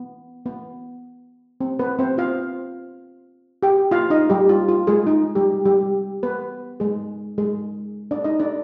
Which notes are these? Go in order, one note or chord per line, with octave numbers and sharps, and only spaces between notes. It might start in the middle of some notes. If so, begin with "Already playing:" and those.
Already playing: B3
B3
C4
B3 B4
C4 C5
F4 F5
G4 G5
F4 F5
D#4 D#5
G3 G4
F4
F4
G#3 G#4
D#4
G3 G4
G3 G4
B3 B4
G#3 G#4
G#3 G#4
D4 D5
D#4 D#5
D4 D5